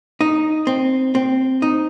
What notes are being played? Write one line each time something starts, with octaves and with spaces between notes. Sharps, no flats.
D#4
C4
C4
D#4